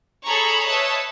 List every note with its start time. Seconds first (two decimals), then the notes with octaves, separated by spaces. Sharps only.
0.25 G#4 A4 C#5 A#5 B5 C#6
0.67 B4 C#5 D#5 E5 A5